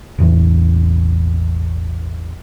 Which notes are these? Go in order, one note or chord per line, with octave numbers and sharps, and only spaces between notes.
E1 A1 E2